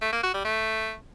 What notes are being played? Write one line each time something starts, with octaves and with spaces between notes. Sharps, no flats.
A3
A#3
F#4
G3
A3